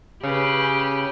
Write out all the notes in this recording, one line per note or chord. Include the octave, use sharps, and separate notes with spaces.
C#3 G4 B4